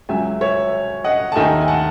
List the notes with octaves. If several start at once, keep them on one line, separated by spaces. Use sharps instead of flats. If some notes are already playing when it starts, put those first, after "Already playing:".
C#2 C#3 F#3 E5 G#5
C#5 E5
D#5 F#5
A5
D#2 D#3 A3 D#4 E5 G#5
G#5
F#5 A5